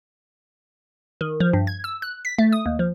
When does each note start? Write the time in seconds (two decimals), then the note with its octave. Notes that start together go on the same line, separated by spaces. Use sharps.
1.21 D#3
1.40 F3
1.53 G2
1.67 G#6
1.84 E6
2.02 F#6
2.25 B6
2.38 A3
2.53 D#6
2.66 D#2
2.79 F3